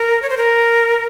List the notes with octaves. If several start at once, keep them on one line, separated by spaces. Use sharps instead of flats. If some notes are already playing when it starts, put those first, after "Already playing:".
Already playing: A#4
C#5
C5
A#4